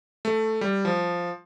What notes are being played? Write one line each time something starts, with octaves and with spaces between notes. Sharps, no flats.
A3
G3
F3